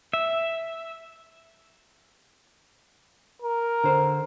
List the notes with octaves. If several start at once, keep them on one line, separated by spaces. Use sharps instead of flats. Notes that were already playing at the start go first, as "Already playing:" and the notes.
E5
A#4
D3 C5